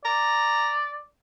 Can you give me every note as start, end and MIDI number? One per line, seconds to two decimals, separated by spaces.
0.05 1.02 74
0.05 0.74 82